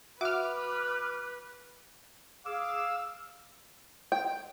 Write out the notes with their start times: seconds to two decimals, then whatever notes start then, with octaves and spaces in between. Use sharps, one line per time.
0.21 F#4 B4 E5 F#5 D6 F6 F#6
2.46 G#4 F5 D6 E6
4.12 G5